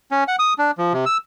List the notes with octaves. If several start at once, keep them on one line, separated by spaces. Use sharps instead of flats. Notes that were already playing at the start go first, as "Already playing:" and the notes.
C#4
F#5
D#6
D4
F3
C3
E6